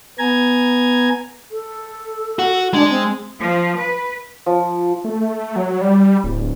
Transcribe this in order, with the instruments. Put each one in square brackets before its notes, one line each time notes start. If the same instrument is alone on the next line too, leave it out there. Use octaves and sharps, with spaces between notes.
[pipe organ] B3 G#5 A#5 G#6
[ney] A4
[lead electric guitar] F#4
[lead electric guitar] G#3 [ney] D4
[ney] C4
[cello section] F3
B4
[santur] F3
[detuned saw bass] A3
F#3
G3
D1